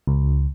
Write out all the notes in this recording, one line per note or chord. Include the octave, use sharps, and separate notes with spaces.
C#2